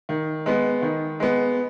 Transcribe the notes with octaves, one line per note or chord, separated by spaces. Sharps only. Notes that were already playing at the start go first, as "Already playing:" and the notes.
D#3
G#3 B3
D#3
G#3 B3